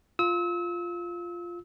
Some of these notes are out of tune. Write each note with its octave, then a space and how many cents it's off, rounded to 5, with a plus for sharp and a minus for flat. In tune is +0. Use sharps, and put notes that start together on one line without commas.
F4 +0 E6 -35